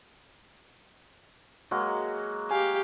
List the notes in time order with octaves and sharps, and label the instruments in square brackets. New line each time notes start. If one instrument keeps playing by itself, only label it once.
[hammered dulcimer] F#3 G#3 A#3
[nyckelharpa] G4 F5 [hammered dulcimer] G#5